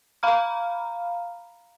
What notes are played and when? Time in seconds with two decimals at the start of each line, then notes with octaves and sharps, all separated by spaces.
0.23 F5 A#5 B5 F6